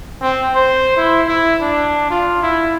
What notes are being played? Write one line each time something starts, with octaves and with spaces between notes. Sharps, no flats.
C4
C5
E4
E4
D4
F4
E4